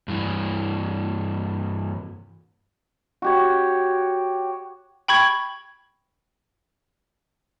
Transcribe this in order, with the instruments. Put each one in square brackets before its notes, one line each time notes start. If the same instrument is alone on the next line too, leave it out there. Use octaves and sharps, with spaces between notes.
[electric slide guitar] G2 E3
[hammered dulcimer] F#4 G4 C#5
[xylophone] G5 B5 C#6 G#6